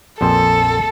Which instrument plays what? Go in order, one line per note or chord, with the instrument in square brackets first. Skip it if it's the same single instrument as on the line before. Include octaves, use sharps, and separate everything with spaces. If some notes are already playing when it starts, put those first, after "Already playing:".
[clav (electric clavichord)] A#1 F2 C5 [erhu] A4